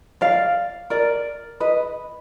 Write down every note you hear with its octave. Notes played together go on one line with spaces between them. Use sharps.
D5 F5
A#4 D5
B4 D#5